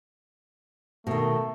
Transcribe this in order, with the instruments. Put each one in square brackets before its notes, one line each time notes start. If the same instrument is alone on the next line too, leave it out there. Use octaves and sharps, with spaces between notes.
[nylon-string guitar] B2 D#3 [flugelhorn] A3